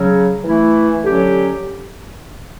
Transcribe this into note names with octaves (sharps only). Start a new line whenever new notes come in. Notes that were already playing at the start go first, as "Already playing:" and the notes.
Already playing: C#3 F#3 C#4
E3 A3 E4
D3 F#3 C#4 G4